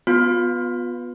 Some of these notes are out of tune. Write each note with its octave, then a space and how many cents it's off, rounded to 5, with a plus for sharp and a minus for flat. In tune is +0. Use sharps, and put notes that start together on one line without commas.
B3 +0 F4 +30